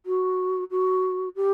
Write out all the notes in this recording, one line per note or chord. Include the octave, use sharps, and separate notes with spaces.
F#4
F#4
G4